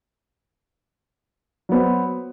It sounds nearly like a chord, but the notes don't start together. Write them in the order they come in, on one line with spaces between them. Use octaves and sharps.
F#3 B3 C5